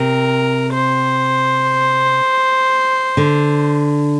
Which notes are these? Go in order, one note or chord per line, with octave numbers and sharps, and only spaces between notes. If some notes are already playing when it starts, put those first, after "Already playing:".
Already playing: C3 A#4
C5
D3